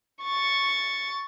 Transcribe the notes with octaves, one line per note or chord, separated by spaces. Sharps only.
C#6 A6